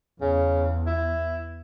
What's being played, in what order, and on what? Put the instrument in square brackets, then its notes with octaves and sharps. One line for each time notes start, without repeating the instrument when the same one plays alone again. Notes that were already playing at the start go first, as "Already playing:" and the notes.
[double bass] E2 [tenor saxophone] C#3
[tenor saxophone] E4